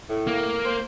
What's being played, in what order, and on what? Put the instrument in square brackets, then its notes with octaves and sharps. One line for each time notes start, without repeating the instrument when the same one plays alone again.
[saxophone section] A2
[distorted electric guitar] A#3
[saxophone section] C5